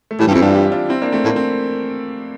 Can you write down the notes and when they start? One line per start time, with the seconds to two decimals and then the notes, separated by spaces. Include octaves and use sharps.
0.11 A3
0.19 A2 E3 G3
0.27 G2
0.31 F2 C4 E4
0.42 G2 D4 F4
0.55 E4 G4
0.72 D4 F4
0.89 C4 E4
1.02 A#3 D4
1.12 A3 C4
1.24 A2 A#3
1.36 C4